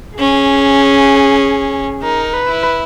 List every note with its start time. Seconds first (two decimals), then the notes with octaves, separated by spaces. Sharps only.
0.18 C#4 G#4
2.02 D#4 A#4
2.33 B4
2.48 E4